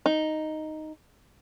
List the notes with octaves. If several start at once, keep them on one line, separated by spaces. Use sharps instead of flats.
D#4